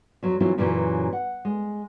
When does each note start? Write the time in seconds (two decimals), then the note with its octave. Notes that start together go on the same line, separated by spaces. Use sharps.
0.23 F2 F#3
0.40 E3 F#3 A#3 C4 E4 F4
0.58 F#2 A#2 C#3 E3 F#3
1.13 F#5
1.45 G#3